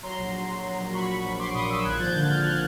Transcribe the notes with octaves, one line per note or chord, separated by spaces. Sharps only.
F#3 A#5 C6
A#1
F#3
F#3
F#3
A#1
F#3 B5 C#6
F#3
A#1
A#1 C6 D6
A#2 C#6 D#6
A#2 D6 E6
G#1 F#6 G#6
F3 G6 A6
D3 G6 A6
G#1 F6 G6
D3 F#6 G#6